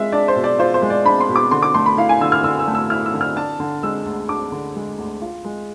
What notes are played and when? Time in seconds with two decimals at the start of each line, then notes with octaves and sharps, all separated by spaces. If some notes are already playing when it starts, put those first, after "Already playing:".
Already playing: G#3 F4 E5
0.12 D4 D5
0.28 C5
0.36 B2
0.44 D5
0.59 F4 C5
0.74 C5
0.82 G#3
0.90 D5
1.05 D4 B5
1.21 C6
1.29 B2
1.36 D6
1.51 D3 C6
1.63 D6
1.74 A3 C6
1.86 B5
1.97 E4 F5
2.09 G#5
2.21 D3 E6
2.32 F6
2.44 D3 E6
2.59 E6
2.67 A3
2.75 E6
2.90 E4 F6
3.06 E6
3.14 D3
3.21 F6
3.36 D4 A5
3.60 D3
3.83 G#3 E6
4.05 D2
4.29 D4 D6
4.52 D3
4.76 G#3
4.98 D2
5.22 F4
5.45 G#3